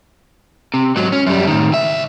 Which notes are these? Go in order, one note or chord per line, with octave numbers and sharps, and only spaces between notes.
C3
G#2 F#3
C#4
F#2 G3
A2 D#3
C#2 E5